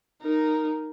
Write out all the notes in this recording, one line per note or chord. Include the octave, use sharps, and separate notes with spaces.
D#4 A#4